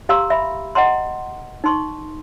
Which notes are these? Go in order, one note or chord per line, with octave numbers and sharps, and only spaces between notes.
G4 F5 A#5 C6 E6
E5 B5
D#5 F#5 A#5 C6
D#4 C6 C#6